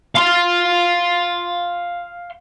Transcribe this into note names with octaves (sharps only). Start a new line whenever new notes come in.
F5 C6